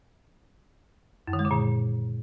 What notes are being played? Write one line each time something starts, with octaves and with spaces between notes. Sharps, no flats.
F#2
D#3
G#3
D3
A#2